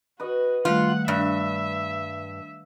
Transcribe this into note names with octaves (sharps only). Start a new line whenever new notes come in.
F#4 B4 D#5
D#3 G3 A3 F4 F5 F#5
G2 E5